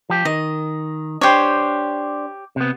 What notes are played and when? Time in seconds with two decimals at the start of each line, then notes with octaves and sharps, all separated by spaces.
0.10 F3 G4
0.25 D#3 D#5
1.21 D4 G4 C5 C#5
2.56 C3 B3